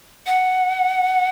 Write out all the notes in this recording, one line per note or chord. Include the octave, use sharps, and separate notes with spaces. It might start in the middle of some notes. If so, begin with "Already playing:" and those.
F#5